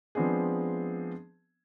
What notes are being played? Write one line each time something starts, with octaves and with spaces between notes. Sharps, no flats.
F3 G#3 B3 C4 D4 G#4